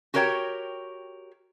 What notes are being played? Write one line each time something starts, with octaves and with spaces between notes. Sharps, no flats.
F#4 G4 A#4 C#5 F5 G5